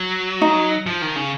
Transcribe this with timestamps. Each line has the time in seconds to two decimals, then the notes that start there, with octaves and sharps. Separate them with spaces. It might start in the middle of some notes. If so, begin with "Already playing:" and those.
Already playing: F#3
0.41 D#4
0.87 F3
1.02 D#3
1.16 C#3